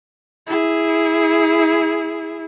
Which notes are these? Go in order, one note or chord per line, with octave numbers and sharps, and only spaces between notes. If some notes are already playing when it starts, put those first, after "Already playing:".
E4 G#4